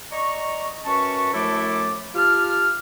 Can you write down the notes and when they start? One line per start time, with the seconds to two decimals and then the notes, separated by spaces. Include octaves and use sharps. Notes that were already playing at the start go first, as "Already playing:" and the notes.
0.11 D5 D#5 A#5 C#6
0.85 F#2 C#4 B4 A5 C#6
1.33 F#2 F3 A3 E4 A4 D6
2.14 F4 G4 A5 F6